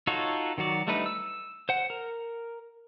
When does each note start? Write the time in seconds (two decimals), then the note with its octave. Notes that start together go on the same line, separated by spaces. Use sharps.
0.07 D#4 F4 F#4 A4 C#5
0.58 D#3 F#3 F#4 D5
0.87 G3 A3 D4 D#4 B4
1.06 E6
1.69 C5 F#5
1.90 A#4